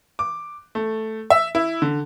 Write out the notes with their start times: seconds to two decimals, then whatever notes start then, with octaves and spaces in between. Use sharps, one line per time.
0.19 D6
0.75 A3
1.30 E5
1.55 E4
1.82 D3